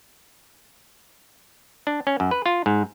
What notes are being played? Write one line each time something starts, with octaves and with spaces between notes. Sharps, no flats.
D4
C#4
F#2
B4
F4
G#2